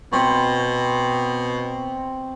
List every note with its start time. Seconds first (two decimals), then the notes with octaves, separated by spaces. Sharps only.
0.13 B2 C4 B5 C#6